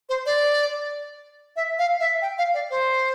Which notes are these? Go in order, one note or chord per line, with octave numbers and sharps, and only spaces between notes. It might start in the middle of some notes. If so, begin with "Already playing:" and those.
C5
D5
E5
F5
E5
G5
F5
D5
C5